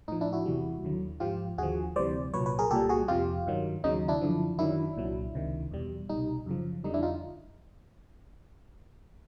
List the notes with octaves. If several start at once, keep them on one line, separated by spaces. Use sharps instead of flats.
A2 F3 D#4
D4 E4
E4 F#4
E2 C3 E3 G3
D#2 D3 F#3
G#2 F3 F4 G4
D#2 D3 F3 F#4 G#4
D2 C3 E3 G3 C5 D5
C2 A#2 F#3 B4 C#5
B4 C#5
G#4 A#4
C2 A#2 G3 G4 A4
F#4 G#4
F2 C3 F3 F4 G4
G2 D#3 F#3
D#2 C#3 F#3 D#4
D4 E4
F#2 D3 F3
F#2 D#3 F#3 D4 E4
C2 A#2 F#3
C#2 C3 D#3
E2 B2 G3
C2 B2 G3 D#4
F#2 C#3 F3
F2 D3 G3 D#4
D4 E4
D#4 F4